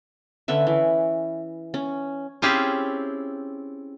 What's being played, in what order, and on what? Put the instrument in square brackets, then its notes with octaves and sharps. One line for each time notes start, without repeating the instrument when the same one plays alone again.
[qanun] D3 C#4 B4 E5
E3
C#4
[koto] C4 C#4 E4 F4 G4 G#4